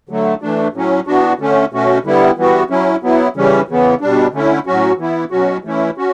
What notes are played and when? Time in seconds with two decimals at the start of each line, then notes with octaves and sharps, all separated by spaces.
0.09 D3 F#3 A3
0.42 E3 A3 D4
0.74 A2 F#3 C#4
1.07 E3 B3 D4 F#4
1.39 D3 A3 C#4
1.72 B2 A3 C#4 F#4
2.04 D3 G3 B3 E4
2.37 E3 G3 B3 F#4
2.70 F#3 C#4 E4
3.03 F#3 B3 E4
3.36 C#3 E3 G3 C#4
3.68 C#3 E3 B3
4.01 B2 G3 D4
4.33 D3 A3 C#4 E4
4.67 A2 F#3 C#4 F#4
4.98 E3 B3 E4
5.31 B2 F#3 C#4 F#4
5.64 E3 A3 C#4 E4
5.97 C#4 F#4